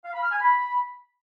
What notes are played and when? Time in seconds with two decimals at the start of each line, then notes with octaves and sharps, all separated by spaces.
0.05 F5
0.14 B5
0.23 F6
0.32 G#5
0.41 B5